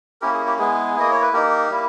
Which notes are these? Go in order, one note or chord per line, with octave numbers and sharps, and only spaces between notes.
A#3 C#4 E4 G4 A#4
G#4
G4
G#3 B3 E4 G#4
A#3 E4 D#5
C#5
B4
A#3 D#4 G4 A#4
G3 A#3 E4